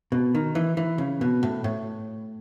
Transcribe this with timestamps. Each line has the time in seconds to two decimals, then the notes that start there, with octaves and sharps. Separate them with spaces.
0.12 B2
0.35 D#3
0.55 E3
0.77 E3
0.98 C#3
1.21 B2
1.43 A2
1.64 A2